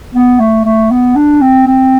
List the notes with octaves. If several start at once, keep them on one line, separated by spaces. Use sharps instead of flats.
B3
A3
A3
B3
D4
C4
C4